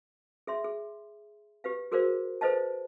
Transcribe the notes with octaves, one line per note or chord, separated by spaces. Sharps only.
G#4 E5 C6
G#4
G4 B4 F5
F#4 G#4 A#4 C5 D5 F5
A4 B4 C5 D#5 F5 A5